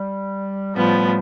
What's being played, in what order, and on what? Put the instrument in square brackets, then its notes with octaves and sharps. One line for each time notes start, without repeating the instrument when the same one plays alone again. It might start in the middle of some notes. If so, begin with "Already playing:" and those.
Already playing: [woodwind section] G3
[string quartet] A2 F3 B3 [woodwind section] G3